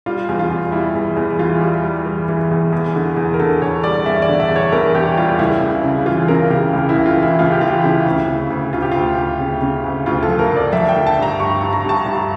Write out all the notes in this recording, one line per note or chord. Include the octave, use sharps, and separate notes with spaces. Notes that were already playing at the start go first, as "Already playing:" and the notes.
G3 F4
E2
F4
E2
G3 E4
E2
E2
E3 F4
G3
G3
E3
E3
E2
E2
D3
E2
A#4
D3 A4
E2 C#5
G3 D5
E2 E5
D5
D3
E5
E2
C#5
E2 A#4
E2 G4
G3 F4
C#2 E4
C#3
C#3
E3 F4
C#3 A#4
C#3 G4
C#2
E4
C#2
F4
E3
E4
C#2 F4
G4
E3 F4
C#3 E4
D2
C#3
D2
D2 F4
G4
D2 F4
D2
C#3
C#3
D2
D2 F4
A4
F3
A#4
D2
D5
F3 E5
G5
D3
A5
G2 A#5
G2 C#6
G2
A#5
G2 A5
G2